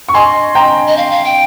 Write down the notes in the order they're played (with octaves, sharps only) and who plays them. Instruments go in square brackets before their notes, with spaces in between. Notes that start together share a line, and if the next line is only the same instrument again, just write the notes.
[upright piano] C#6
[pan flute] D#5 [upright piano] G#5 C6
[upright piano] G5 A#5
[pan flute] D#5
F5
F5
G5